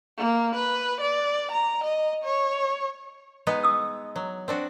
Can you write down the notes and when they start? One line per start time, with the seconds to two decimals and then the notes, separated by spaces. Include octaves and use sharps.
0.17 A#3
0.55 B4
1.01 D5
1.51 A#5
1.84 D#5
2.24 C#5
3.47 G#3 B3 D#4
3.63 D#6 E6
4.16 F#3
4.48 C4 D4 F#4